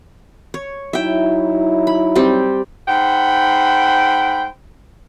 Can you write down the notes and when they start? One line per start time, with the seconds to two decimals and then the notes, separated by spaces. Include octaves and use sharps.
0.54 C#5
0.93 F#3 D#4 E4 E5 G5
1.87 B5
2.15 G3 C4 G4
2.88 G#2 C5 F#5 G5 B5